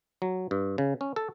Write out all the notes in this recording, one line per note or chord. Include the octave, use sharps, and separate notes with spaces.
F#3
G2
C#3
C#4
A4